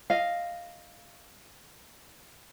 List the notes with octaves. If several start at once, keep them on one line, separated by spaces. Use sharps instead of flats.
D#5 F5